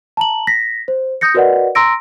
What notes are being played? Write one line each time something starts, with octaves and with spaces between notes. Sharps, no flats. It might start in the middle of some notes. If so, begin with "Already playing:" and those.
A5 A#5 F#7
A#6 B6
C5
D#6 G6 A#6 C#7
F#4 A#4 B4 D5 D#5 F#5
A#5 C6 E6 A#6 D7